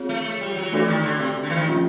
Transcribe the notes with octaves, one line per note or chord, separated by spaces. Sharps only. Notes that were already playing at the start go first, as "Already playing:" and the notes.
Already playing: C4 F4 G#4 C#5
A3
A3
G3
F#3
E3 A3 D4 F#4 A4 D5
D#3
D3
C3
D3
E3
D#3
D3 F3 A#3 C#4 F4